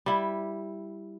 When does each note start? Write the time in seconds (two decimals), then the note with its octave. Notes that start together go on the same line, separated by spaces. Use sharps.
0.06 G3 E4